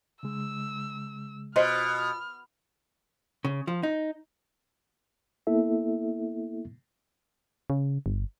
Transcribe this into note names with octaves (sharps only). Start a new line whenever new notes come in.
C#3 G#3 E6
B2 F4 C5 D#5 C6 F6
C#3
F3
D#4
A#3 B3 E4 A4 E5
C#3
G1